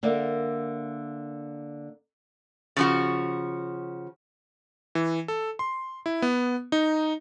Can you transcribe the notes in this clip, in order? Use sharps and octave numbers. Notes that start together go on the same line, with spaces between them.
D3 A#3 A#4 D5 E5
C#3 F3 F#4
E3
A4
C6
E4
B3
D#4